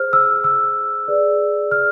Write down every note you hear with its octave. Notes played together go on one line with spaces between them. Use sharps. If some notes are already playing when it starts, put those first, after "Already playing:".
Already playing: G#4 C5 F6
E6
E6
G#4 B4 D5
F6